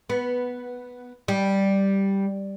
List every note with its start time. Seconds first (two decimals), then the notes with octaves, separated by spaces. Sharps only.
0.10 B3
1.28 G3